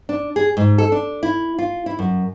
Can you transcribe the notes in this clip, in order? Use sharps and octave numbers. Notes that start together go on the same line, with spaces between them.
D4
G#4
G#2
A4
D4
E4
F4
E4
F#2